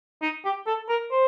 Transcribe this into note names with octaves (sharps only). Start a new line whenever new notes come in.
D#4
G4
A4
A#4
C5